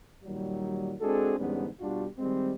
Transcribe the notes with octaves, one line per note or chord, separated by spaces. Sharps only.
A#2 D#3 F#3 G3
G#3 C4 D4 F#4 G#4 A4
E2 G#2 D3 G3 B3 C#4
B2 G3 D4 F4 F#4
D#3 G3 G#3 C4